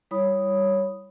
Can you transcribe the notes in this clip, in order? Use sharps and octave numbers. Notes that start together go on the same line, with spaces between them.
G3 E4 C#5 B5 D#6